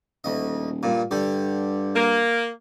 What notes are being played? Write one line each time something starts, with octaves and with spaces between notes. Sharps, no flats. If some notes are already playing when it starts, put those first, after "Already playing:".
D#1 D2 D#5
G2 A#2
G2 D3 G4
A#3